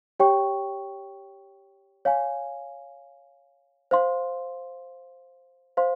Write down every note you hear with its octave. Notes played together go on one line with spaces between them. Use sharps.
G4 C#5 G5 C#6
C#5 F5 G#5
C5 F5 C6
C5 F5 C6